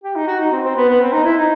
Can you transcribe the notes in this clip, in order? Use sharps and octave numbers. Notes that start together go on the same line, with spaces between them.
G4
D#4
F#4
D#4
C4
C4
B3
B3
C4
D#4
E4
D#4